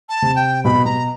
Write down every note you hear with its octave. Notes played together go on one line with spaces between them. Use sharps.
A5
C3
G5
B2 B5
B2 A#5